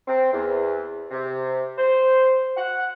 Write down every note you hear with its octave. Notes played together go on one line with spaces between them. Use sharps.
C4
E2
C3
C5
F#5